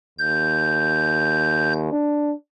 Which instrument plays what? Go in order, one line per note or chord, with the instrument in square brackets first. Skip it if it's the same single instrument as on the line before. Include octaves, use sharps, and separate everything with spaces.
[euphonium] D#2 [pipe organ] G6
[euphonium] D4